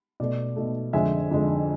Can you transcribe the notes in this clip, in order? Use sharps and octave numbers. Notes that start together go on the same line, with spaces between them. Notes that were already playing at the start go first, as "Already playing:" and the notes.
B2 A3 D5
B2 A3
F2 D3 G#3 E5 G#5
F2 D3 G#3